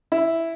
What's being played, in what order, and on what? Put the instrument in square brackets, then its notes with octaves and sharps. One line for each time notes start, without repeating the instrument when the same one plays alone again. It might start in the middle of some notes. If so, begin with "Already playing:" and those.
[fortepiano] E4